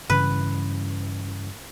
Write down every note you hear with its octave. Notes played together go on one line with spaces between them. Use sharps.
G2 C#3 E3 B4